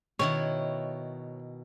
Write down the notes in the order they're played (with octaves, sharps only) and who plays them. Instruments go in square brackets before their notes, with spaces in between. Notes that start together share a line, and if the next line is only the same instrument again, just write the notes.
[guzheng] B2 D#3 E4 [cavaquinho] C#5